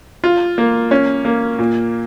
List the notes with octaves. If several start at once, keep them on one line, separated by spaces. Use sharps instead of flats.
F4
A#3
C#4
A#3
A#2